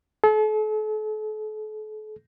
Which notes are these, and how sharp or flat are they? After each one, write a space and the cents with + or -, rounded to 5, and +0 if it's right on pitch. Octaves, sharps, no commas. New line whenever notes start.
A4 -40